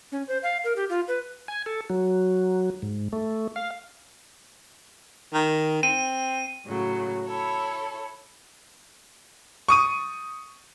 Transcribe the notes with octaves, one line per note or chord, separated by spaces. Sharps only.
C#4
C5
F5
A#4
G4
F4
B4
G#5
A4
F#3
G#2
A3
F5
D#3
C4 D#7
A2 C#3 F#3
E4 A4 C#5
C#6 D#6 D#7